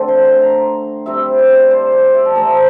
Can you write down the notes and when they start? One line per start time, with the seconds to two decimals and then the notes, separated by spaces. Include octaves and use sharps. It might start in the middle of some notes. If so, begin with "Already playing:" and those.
Already playing: D3 A3 C4
0.08 C6
0.25 C6
0.42 A#5
1.06 C3 G3 C4 E5
1.39 D5
1.71 C5
1.92 D5
2.14 E5
2.25 A5
2.35 C3 E3 A3 C4 A#5